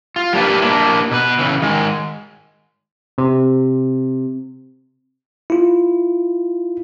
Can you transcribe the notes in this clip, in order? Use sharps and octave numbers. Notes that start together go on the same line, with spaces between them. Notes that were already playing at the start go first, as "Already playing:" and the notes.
F4
G3 A#3 D4 E4 B4
A#3 D4 E4
B2 B4
C#3 E3
D#3 G#3
C3
E4 F4